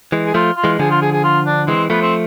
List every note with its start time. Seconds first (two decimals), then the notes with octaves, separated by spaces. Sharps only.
0.12 E3 G#3
0.26 G#4
0.34 F3 A3 F4
0.57 F4
0.64 E3 G#3
0.79 D3 F3 G#4
0.90 F4
1.02 G#4
1.12 G#4
1.24 F4
1.46 D4
1.68 E3 G#3 C4
1.90 F3 A3 B3
2.02 C4